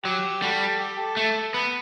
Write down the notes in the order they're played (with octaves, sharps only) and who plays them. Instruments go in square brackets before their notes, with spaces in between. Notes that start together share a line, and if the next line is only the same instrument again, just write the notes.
[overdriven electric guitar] F#3 [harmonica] G4
[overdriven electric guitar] G3 [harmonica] F#4 A4
[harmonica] G4
A4
[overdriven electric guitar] A3
[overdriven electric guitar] B3 [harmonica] B4